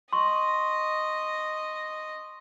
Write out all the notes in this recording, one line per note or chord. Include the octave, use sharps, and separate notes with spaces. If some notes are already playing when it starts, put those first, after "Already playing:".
D#5 C6 C#6